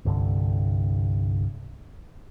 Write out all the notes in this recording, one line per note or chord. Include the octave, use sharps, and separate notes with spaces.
C2 G2 D3